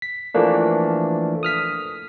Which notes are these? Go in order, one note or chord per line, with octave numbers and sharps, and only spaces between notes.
B6
E3 F3 A3 A#3 D4
D#6 F6 B6